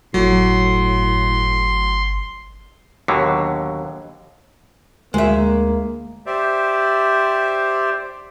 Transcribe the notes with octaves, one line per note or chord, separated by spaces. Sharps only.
G1 A2 F#3 C6
D#2 B2 D3 F#3
D2 G#3 A#3 E5
G4 C5 D5 E5